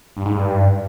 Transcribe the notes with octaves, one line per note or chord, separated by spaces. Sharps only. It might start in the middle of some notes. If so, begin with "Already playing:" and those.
G2
G#2
G2